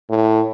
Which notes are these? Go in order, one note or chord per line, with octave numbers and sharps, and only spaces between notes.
A2